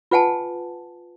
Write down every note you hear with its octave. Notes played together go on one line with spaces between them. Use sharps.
F4 B4 F#5 G#5 A5